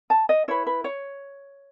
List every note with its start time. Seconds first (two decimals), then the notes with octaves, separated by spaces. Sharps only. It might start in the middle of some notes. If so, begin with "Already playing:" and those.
0.10 A5
0.29 D#5
0.48 E4 B4 C#5
0.67 B4
0.84 C#5